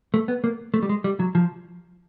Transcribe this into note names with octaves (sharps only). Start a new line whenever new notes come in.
A3
B3
A#3
A3
G3
G#3
G3
F#3
F3